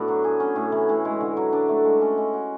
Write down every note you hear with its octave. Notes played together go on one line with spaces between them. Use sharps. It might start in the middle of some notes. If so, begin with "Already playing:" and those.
Already playing: A2 B3 D4 F#4
F#3
G#4
C#4
A2
E3
A2
G#3
D3
F#3
D4
A3
G#3
C#4
G#3
F#4